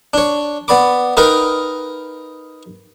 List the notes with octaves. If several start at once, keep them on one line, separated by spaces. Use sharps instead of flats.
D4 C#5
B3 D5 B5 D6
D#4 A#4 B4 D#5 F5 G5